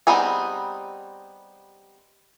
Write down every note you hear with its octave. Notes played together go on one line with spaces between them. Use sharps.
G3 B3 C4 D#4 G#4